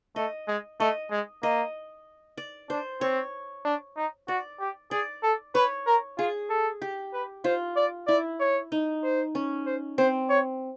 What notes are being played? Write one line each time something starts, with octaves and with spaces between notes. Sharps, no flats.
A3 D#5
G#3
A3 D#5
G#3
A#3 D#5
D5
D4 C5
C4 C#5
D4
D#4
F#4 D5
G4
G#4 D5
A4
B4 C#5
A#4
F4 G#4
A4
G4
B4
F4 C5
D5
E4 D5
C#5
D#4
C5
C#4
C5
C4 C5
C#5